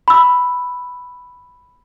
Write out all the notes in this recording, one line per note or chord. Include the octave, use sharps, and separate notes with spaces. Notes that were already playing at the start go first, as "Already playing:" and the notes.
B5 E6